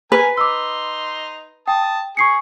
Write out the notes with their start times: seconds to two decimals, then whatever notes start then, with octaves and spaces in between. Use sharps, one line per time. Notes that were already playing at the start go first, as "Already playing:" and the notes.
0.12 A#4 B4 G#5
0.38 D#4 C6 D6 E6
1.68 G5 A5 D#6
2.17 G#4 C#6 C7 C#7